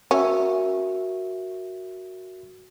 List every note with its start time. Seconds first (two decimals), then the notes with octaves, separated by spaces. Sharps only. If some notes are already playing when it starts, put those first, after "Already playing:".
0.11 C#4 F#4 A#4 E5